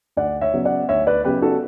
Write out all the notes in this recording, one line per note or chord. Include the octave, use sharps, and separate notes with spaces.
D2 D5 F#5
C#5 E5
C#3 F#3 B3
D5 F#5
D2 C#5 E5
B4 D5
C#3 F#3 B3 G4 B4
F#4 A4